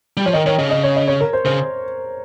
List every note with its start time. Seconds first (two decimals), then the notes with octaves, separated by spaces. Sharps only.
0.17 G3
0.26 F3 C#5
0.33 D#3 D#5
0.46 D#3 C#5
0.58 C#3 D#5
0.71 D#5
0.83 C#5
0.96 D#5
1.08 C#5
1.21 A#4
1.33 C5
1.45 C#3 C5